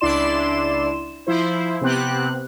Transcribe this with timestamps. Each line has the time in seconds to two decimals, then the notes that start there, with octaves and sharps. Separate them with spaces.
0.01 C#2 D4 E4 D5 C6 E7
1.27 F3 E4 C5
1.81 C3 B3 C4 G4 F#6